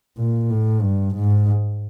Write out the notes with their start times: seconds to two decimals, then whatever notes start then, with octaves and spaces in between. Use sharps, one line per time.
0.18 A#2
0.50 A2
0.82 G2
1.15 G#2